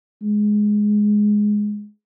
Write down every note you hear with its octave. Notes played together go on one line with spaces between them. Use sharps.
G#3